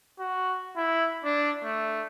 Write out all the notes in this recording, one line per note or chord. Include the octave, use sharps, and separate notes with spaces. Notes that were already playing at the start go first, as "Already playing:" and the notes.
F#4
E4
D4
A3